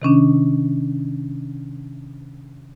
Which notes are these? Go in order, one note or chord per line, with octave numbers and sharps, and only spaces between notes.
C3 D#3 C#4 D4